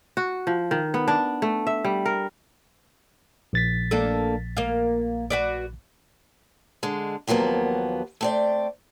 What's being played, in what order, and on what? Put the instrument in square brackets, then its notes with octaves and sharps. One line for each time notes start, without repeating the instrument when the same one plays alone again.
[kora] F#4
F3
D#3
B3
D4
A3
E5
G3
A#4
[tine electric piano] A#1 A6 B6
[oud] A#3 D4 A4
A#3 F5
F#4 B4 D5
[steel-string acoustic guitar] D3 G#3
D#2 F3 F#3 A#3 B3
A3 C4 D5